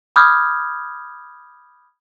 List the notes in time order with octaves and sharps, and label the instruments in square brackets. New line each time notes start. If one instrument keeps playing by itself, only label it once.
[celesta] B5 D6 D#6 F6 G6 G#6